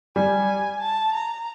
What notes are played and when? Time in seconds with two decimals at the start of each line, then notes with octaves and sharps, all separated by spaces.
0.16 G3 G#5
0.82 A5
1.14 A#5